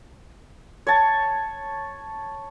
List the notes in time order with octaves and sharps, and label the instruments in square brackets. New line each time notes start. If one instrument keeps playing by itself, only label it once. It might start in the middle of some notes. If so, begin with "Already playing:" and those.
[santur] C#5 A5